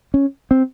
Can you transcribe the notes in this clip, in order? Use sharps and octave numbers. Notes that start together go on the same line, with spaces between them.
C#4
C4